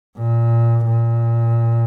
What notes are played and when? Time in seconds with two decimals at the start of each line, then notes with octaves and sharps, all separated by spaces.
0.18 A#2
0.86 A#2